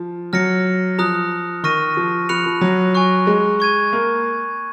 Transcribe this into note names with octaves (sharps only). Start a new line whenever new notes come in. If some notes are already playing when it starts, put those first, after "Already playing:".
Already playing: F3
F#3 F6 A#6 C#7
F3 A#5 D#6 F#6
D#3 C#6 F6 A#6 D#7
F3
F3 B5 F#6 C#7 F7
F3
F#3
G#5 C#6 F#6
G#3
C#6 G#6 D#7
A#3